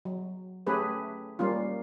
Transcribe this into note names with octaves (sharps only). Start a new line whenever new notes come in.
F#3
A3 C#4 G4 G#4 B4
G3 A#3 C#4 F4